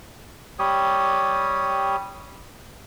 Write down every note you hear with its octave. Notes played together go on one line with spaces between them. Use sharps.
G3 G4 C#5 D#6